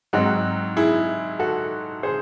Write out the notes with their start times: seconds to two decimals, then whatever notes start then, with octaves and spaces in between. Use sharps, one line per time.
0.13 G#2 F#3 C4 D#4 F#4
0.77 E4 G#4
1.39 F#4 A4
2.03 G#4 C5